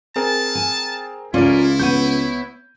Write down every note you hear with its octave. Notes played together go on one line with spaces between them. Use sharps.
C4 G#4 A#4 A5
G#5
C#2 C#4 E4 F4 A#4 C#5 D5
B3 C#5 G6 D#7